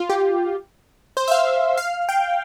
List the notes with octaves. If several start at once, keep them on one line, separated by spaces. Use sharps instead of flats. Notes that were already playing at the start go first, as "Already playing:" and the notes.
Already playing: F4
G4
C5
E5
F5
F5
G5